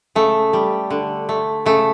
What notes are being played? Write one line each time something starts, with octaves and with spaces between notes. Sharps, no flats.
C#3 A3
G3
D3
A3
C#3 A3